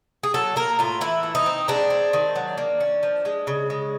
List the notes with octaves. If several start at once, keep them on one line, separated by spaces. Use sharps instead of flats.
G#4
F#3 A4
A#3 A#4
A2 F4
E3 E4
A3
D#4
C4
G#3 D4
C4
D#3
F#3
A#3
C#4
F3
G#3
C#3
G#3